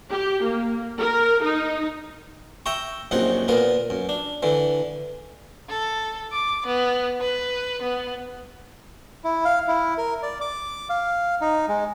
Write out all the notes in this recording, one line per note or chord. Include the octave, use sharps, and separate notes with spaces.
G4
A#3
A#4
D#4
E5 G5 A#5 C#6
A#1 F#2 C3 D#4 F#5
A#2 B3 A#4
F#2
D4
D3 E3
A4
D6
B3
B4
B3
E4
F5
E4
A#4
D5
D6
F5
D#4
G#3